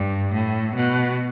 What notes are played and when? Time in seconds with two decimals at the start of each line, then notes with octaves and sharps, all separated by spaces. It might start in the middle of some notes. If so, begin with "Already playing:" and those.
Already playing: G2
0.33 A2
0.75 B2